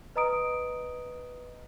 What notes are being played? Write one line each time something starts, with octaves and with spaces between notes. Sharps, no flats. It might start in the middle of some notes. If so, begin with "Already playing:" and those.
B4 D#5 A#5 D#6 D7